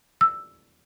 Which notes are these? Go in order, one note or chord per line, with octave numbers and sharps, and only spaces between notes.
E6